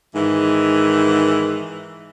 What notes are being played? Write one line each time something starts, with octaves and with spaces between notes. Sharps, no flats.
G#2 D#3 E3